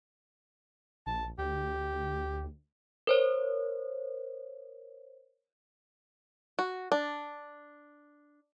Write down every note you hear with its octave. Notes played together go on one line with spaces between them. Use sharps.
A#1 A5
D2 G4
A#4 C5 C#5
F#4
D4